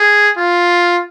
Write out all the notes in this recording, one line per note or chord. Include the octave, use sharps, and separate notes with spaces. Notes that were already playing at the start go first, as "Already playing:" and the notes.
Already playing: G#4
F4